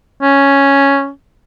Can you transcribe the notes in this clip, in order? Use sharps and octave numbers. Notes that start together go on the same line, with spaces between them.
C#4